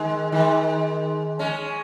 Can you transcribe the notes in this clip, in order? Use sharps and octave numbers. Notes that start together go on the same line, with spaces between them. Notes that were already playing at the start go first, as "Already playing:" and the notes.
Already playing: D#3 G#3
D#3 G#3
G#3 C#4